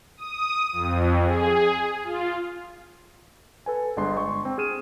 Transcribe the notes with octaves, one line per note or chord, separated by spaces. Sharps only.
D#6
F2
G#4
F4
A4 B4 G#5
G1 G#3 D4 C6
C6 C#6
C4
G#4 F6 D#7 E7